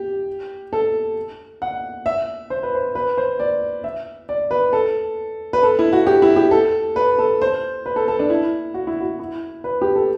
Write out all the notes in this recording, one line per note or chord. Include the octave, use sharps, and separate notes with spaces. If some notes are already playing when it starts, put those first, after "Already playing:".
Already playing: G4
A4
F#5
E5
C5
B4
C5
B4
C5
D5
E5
D5
B4
A4
B4
A4
E4
F#4
G4
E4
G4
A4
B4
A4
C5
B4
A4
A4
D4
E4
F#4
E4
F#4
E4
B4
G4
A4